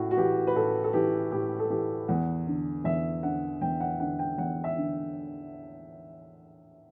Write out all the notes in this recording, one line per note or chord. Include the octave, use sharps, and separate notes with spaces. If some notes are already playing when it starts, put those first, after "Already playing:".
Already playing: A2 F#4
F#4
E3 G4
B4
A2 A4
A4
E3 G4
A2 G4
A4
E3 G4
E2 F#5
D3
E2 E5
D3 F#5
E2 G5
F#5
D3 F#5
G5
E2 F#5
E5
D3